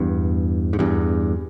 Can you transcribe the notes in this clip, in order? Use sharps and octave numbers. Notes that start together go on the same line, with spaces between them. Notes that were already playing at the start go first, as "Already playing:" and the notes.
Already playing: E2 G2
G#2
E2 G2